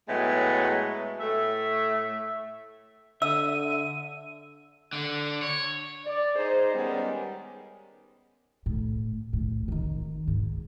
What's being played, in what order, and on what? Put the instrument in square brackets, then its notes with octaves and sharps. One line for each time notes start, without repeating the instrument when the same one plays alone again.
[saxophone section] A2 F#3 G#3 A3 B3
A2 A3 E5
[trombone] D3 [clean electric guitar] E5 [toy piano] E6 [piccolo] D#7
[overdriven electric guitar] D3
C#5
[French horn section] D5
D#4 G#4 C5
D#3 G3 G#3 B3 C#4
[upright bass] A2
A2
D3 D#3
G#2